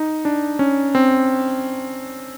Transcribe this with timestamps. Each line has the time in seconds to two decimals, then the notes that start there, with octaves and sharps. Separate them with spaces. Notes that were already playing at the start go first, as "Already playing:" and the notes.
Already playing: D#4
0.25 D4
0.59 C#4
0.95 C4